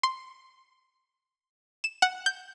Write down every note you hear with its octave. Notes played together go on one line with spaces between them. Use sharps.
C6
E7
F#5
G6